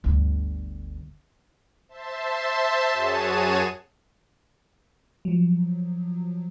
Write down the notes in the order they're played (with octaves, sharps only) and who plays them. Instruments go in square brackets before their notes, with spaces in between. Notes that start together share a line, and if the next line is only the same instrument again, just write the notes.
[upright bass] G1 D2
[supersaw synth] C5 E5 A5 C6
F#2 F#4 G#4 C#5 A5 D#7
[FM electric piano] F3 F#3